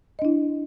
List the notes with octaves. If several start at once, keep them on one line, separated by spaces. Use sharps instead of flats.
D4 E4 D#5